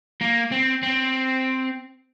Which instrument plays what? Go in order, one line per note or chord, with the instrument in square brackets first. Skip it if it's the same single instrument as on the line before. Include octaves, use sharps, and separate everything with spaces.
[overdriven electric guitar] A#3
C4
C4